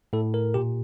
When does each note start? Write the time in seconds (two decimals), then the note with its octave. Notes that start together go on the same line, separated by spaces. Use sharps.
0.13 A2 A4
0.34 A#4
0.54 A#2 G4